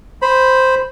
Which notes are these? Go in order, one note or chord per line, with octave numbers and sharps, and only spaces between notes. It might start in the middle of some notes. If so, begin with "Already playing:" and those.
C5 B5